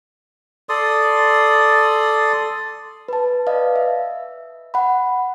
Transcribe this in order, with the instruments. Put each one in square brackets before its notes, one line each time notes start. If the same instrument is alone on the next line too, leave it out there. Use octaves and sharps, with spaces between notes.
[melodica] A4 D5 C6 D#6
[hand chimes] B4 A5
B4 D5 D#5 F5
E5
F#5 B5